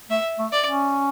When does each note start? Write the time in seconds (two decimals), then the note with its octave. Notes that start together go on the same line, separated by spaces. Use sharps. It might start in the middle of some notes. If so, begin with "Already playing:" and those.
0.10 A3 E5
0.39 A3
0.52 D5
0.66 C#4